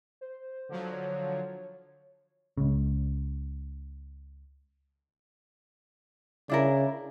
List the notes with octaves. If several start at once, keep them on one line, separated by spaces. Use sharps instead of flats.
C5
D3 F3 F#3
C#5
C#2 C#3
C#3 D4 E4 A#4